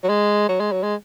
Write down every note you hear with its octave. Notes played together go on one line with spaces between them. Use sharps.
F#3
G#3
F#3
G#3
F#3
G#3